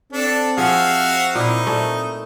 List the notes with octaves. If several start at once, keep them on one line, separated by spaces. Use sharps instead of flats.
C4 D4 A4
F3 F#4 G#4 E5 F5
A#2 D#4 E4
A#2 A3